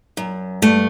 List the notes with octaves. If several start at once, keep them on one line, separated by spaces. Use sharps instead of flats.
F#2
G2 A3